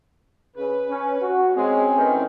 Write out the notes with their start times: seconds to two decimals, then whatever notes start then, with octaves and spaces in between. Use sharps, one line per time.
0.56 C#3 B4
0.88 C#4
1.21 F#4
1.55 G#3 C4 C#4
1.96 A2 D#3 E3